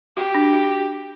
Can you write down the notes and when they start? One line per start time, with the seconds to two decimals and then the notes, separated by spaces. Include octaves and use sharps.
0.16 F#4 G4
0.34 D4
0.53 F#4